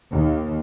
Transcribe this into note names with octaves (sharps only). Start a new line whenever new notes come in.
D#2